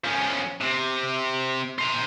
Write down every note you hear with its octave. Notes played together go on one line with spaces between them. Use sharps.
F3 C#4
C3
C5 A#5